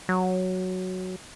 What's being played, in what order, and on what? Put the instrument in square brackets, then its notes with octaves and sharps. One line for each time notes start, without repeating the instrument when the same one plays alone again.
[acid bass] F#3